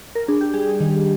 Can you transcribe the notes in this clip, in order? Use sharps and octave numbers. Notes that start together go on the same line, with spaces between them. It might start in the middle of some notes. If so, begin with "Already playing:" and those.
A#4
D4 G#4
G4
G3 G#4
G#4
D#3